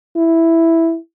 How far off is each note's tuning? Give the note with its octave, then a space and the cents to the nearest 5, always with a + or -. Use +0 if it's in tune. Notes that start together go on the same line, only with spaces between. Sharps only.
E4 +0